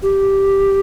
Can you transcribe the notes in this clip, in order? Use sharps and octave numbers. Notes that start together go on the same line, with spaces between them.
G4